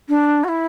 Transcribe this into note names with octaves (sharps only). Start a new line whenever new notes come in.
D4
F#4
E4